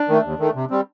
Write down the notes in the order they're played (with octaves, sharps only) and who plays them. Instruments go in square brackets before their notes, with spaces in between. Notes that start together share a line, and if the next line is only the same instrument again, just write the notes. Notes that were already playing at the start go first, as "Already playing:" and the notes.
Already playing: [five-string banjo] D4
[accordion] D#3 A3
D#2
D#3 A3
C3
G3 C4